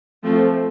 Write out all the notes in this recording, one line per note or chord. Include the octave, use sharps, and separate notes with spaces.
F3 A3 C4